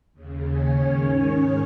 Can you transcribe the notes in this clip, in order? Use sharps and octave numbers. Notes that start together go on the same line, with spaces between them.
D#2 C#3
C#4 C#5
G#2 D#3